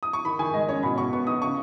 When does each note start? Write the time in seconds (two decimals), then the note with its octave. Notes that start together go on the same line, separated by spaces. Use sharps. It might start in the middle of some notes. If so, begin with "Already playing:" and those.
0.03 D#6
0.13 C#6
0.25 D#3 B5
0.39 D#3 G#5
0.54 G#3 D#5
0.69 C#4 C#5
0.83 B2 B5
0.97 B2 C#6
1.12 B3 C#6
1.27 D#4 D#6
1.41 C#3 C#6